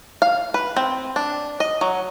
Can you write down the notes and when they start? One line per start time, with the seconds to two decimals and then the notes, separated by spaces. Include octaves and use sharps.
0.22 F5
0.54 B4
0.76 C4
1.16 D4
1.60 D#5
1.81 F#3